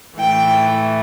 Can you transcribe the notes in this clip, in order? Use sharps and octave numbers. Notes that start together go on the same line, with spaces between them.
A2 E3 A3 G5